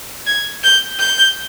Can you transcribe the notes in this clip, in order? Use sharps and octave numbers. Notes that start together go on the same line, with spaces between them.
G#6
G6
G6